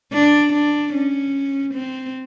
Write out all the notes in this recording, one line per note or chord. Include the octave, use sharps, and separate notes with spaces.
D4
D4
C#4
C4